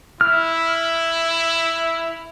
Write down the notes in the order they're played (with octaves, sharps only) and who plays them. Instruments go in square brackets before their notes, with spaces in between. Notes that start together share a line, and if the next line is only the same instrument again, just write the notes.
[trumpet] E4 [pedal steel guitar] F6